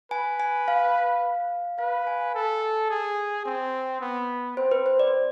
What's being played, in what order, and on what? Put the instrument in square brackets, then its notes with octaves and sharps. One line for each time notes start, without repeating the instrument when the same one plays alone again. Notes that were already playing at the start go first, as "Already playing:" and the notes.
[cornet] B4 [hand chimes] G#5
[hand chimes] G#5
F5
[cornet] B4 [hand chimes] F5
[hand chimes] F5
G#5
G#5
[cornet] A4
G#4
C4
B3
[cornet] C4 [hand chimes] C5
[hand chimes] B4
C5
D5